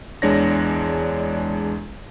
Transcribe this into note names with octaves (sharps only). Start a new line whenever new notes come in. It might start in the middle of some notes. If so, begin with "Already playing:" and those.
E2 G#3 D4 C#5 A#6